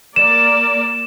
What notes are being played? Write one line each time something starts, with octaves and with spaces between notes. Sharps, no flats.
A#3 A#4 D5 E7